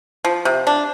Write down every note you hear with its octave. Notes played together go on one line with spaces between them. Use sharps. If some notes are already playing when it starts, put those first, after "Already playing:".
F3
C3
D4